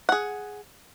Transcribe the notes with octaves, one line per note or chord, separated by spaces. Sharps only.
G#4 F#5